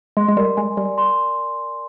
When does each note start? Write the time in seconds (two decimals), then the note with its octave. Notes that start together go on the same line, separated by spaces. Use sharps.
0.17 G#3 C6
0.28 G#3
0.37 G3 A#4
0.57 G#3 G#5
0.77 G3 D5
0.98 C6